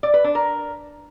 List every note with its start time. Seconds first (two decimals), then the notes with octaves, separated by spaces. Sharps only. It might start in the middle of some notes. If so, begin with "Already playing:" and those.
0.03 D5
0.14 B4
0.24 D4
0.35 A#4